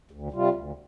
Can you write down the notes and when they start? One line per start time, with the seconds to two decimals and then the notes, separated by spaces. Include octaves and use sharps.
0.11 D2
0.32 C3 G3 F4
0.54 D2